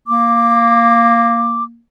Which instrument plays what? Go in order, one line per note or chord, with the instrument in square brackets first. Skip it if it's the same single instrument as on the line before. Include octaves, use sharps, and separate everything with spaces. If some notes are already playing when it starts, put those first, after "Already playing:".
[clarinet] A#3 [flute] D6